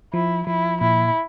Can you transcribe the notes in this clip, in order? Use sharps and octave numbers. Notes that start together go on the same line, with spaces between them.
F3 E4
F3 E4
A#2 E4